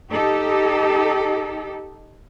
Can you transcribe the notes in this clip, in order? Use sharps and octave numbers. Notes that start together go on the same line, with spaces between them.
D#4 G4 A4